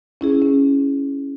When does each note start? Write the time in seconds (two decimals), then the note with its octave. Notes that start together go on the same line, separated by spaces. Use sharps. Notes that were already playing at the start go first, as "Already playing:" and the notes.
0.21 C#4 E4 G#4
0.42 C#4